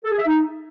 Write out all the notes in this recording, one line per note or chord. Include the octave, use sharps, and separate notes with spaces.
A4
G#4
E5
D#4